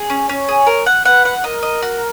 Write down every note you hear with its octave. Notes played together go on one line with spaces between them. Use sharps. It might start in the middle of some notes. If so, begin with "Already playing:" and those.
Already playing: G#4
C#4
C#4 C#5
G#4
A#4
F#5
B4 F#5
F#5
A#4 D#5
D#5
F#4